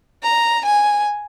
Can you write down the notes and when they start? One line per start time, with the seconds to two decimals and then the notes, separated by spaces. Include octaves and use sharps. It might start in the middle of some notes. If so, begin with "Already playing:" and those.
0.23 A#5
0.65 G#5